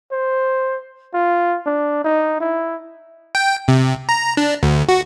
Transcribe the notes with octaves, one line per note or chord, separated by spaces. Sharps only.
C5
F4
D4
D#4
E4
G5
C3
A#5
D4
D2
F#4